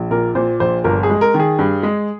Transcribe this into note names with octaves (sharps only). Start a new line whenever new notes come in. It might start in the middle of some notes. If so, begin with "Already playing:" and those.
Already playing: A#1
A#2 A#4
A#2 C5
A#1 C5
G1 A#4
G#4
G#3
A#4
D#3
G#4
G2
G#3